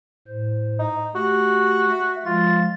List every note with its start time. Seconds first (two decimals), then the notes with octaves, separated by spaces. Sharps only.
0.28 A2 C5
0.79 D#4
1.15 A3 F#4 G4
1.89 E5
2.26 F3 G#3 F4 A6